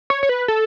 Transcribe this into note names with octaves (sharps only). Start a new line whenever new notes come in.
C#5
C#5
B4
A4